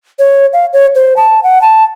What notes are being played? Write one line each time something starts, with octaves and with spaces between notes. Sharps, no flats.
C#5
F5
C#5
C5
A5
F#5
A5